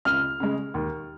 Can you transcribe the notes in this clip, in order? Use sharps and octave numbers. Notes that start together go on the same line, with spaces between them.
C#2 F6
C#3 G#3
D#2